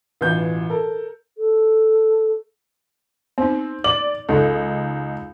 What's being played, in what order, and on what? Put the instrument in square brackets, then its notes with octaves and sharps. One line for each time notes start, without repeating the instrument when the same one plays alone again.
[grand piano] A1 B2 E3 F4 G6
A4 A#4
[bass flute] A4
[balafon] B3 D#4 [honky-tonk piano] C4
[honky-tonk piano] D5 F#7 [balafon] D6
[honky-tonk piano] C#2 D#4 [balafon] A4